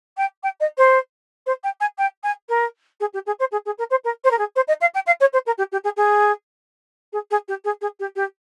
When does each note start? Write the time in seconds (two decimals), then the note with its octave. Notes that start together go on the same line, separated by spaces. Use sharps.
0.17 G5
0.43 G5
0.60 D#5
0.78 C5
1.46 C5
1.63 G5
1.80 G#5
1.98 G5
2.23 G#5
2.49 A#4
3.00 G#4
3.13 G4
3.26 G#4
3.39 C5
3.52 G#4
3.66 G#4
3.78 A#4
3.90 C5
4.04 A#4
4.24 C5
4.31 A#4
4.38 G#4
4.56 C5
4.68 D#5
4.81 F5
4.94 G5
5.06 F5
5.20 C#5
5.33 C5
5.46 A#4
5.58 G4
5.72 G4
5.84 G#4
5.97 G#4
7.13 G#4
7.31 G#4
7.48 G4
7.64 G#4
7.81 G#4
8.00 G4
8.16 G4